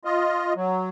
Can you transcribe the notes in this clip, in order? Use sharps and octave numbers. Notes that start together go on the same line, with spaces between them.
F4 D#5
F#3